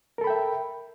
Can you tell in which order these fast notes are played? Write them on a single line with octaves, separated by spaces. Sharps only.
A#4 A4 B5 G5 E5